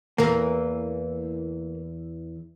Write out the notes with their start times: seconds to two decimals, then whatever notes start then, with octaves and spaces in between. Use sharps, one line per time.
0.18 E2 E3 A#3 A#4